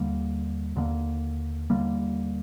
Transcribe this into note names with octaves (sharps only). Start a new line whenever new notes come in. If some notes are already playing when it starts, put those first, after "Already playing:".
Already playing: D#2 D3 G3 A#3
D#2 D3 G3 A#3
D#2 D3 G3 A#3